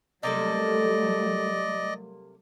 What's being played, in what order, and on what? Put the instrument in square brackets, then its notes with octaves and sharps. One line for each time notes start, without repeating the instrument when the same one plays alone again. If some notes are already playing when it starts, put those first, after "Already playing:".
[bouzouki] C3 A#3 A4 [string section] F#3 G3 A3 [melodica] D5 D#5